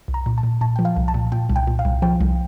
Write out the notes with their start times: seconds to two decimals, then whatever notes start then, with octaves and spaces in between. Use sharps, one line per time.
0.08 C2
0.14 A#5
0.26 A#2
0.38 A5
0.43 A#2
0.61 A#2 A5
0.76 F3 G5
0.85 F5
0.96 C2
1.08 A5
1.14 A#2
1.32 A#2 G5
1.49 C2
1.56 G5
1.67 A#2
1.79 F5
1.85 C2
2.02 F3 G5
2.20 C2